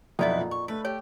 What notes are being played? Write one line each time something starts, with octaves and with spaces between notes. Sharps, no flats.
B1 F2 D#4 E4 A4 B4 D5 D#5
A#2
C#6
A3 B4
G4 C#5